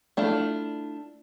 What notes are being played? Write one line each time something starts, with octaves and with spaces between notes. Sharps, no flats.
A3 D4 E4 F4